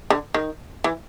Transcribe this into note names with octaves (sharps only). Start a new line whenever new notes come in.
D3
D#3
E3